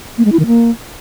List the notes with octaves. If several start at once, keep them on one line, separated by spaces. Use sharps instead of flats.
A#3
G#3
E4
D#3
A#3